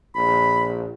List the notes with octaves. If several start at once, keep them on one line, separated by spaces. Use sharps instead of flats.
A#1 B5